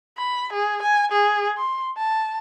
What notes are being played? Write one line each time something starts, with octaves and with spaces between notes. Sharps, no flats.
B5
G#4
G#5
G#4
C6
A5